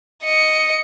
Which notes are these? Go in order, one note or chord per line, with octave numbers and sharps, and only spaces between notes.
D#5 C#7